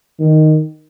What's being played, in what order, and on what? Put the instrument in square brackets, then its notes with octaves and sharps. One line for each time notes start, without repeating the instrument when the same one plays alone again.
[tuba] D#3